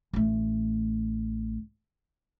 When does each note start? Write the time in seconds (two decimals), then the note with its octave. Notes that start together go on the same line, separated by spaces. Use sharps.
0.13 A1 A3